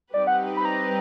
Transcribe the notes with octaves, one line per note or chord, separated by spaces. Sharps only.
G3 C4 D#4 G4 B4 D5
F#5
B5
A#5